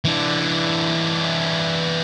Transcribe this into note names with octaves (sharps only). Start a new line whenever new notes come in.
E3 D4